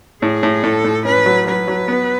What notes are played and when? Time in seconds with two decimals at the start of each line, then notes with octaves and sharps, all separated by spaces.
0.22 A2 G#4
0.43 A2
0.63 A2 A4
0.84 A2
1.05 C#4 B4
1.26 F#3
1.47 F#3 B4
1.68 F#3
1.88 B3